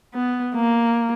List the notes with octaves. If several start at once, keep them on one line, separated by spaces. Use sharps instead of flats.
B3
A#3